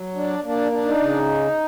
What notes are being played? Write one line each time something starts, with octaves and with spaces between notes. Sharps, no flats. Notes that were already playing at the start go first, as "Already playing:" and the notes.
Already playing: F#3
D4
A#3 D4
D4
D#4
C#3